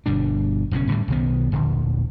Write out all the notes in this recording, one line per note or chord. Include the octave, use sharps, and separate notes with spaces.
G1 B2 G3 D4
F#1 B2 D3 C#4
A2 D3 G3
B1 D#3 B3
D#1 A#1 D3